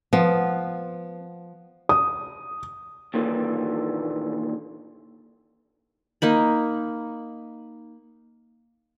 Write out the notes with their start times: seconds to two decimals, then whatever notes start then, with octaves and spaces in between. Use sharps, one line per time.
0.13 F3 B3
1.89 D#6
3.14 D#2 A#2 D3 E3
6.22 A#3 D#4 B5